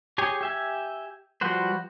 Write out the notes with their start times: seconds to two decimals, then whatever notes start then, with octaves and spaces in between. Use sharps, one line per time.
0.18 G4 G#4 C#5 G#5
0.41 G4 E5 G#5
1.41 F3 G3 F#4 B4 C5